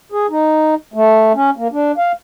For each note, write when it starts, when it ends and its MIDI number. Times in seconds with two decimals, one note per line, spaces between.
0.12 0.27 68
0.30 0.75 63
0.94 1.33 57
1.35 1.50 61
1.57 1.68 58
1.72 1.92 62
1.98 2.12 77